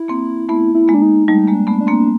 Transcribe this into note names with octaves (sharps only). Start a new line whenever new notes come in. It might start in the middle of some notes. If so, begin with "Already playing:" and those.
Already playing: E4
A#3 C4
A3 B3 E4
E4
G#3 A#3
D4
D#4
G3 A3 D#4
G#3 A#3
D4
A3 B3
D4
A#3 C4